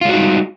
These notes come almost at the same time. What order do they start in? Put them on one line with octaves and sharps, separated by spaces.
F4 G#3 F#4 D#4 G3